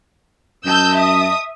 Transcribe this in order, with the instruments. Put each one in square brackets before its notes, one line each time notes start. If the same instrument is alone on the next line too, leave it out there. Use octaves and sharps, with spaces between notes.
[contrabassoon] F#2 [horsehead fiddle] D#5 A5 [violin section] E6 G6
[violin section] E5 D#6